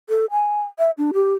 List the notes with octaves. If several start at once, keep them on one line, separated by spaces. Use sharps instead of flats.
A4
G#5
E5
D4
G4